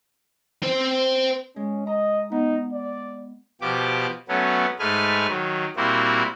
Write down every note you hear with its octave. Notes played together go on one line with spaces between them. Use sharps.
C4 C5
G#3 C#4
D#5 A#5
B3 D#4
D5
B2 F3 G4 D6
F#3 A3 B3 C#4
G#2 G#3 A3 B4 G#5 F6
D#3 F#3
A#2 G3 A#3 C4 E4 F#4